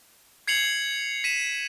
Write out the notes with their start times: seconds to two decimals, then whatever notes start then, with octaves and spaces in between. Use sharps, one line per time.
0.48 G#6 C7 C#7 F7 F#7
1.24 B6 D#7 E7